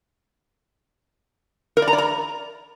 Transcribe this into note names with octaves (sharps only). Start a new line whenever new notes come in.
A#4
D5
A#5
D5
A#5